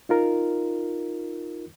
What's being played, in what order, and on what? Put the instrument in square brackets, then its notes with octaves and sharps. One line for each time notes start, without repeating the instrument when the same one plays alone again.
[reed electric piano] D#4 F4 A#4